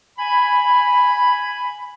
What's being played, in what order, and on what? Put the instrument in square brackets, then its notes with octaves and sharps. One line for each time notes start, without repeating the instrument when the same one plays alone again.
[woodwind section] G#5 B5